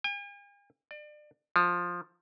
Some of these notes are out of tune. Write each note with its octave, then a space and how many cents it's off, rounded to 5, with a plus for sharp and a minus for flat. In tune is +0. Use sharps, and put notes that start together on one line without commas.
G#5 -45
D5 +30
F3 +10